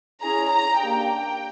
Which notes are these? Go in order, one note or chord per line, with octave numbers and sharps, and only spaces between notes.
C#4 E4 G#4 A#5
A#5
A#3 D4 G4 G5